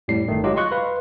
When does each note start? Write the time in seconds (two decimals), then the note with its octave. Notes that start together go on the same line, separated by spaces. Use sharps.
0.08 F2 A2 G3 C7
0.28 G1 D#3 A3
0.44 F#3 G#3 F4 G4 D#5
0.56 D#5 C6 C#6 F#6
0.72 B4 F5 C6